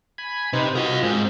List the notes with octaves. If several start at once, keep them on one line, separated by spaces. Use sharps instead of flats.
G#5 B5
C3 D#4 B4 C5
F4 F#4 A#4 D#5 F#5
G#2 C4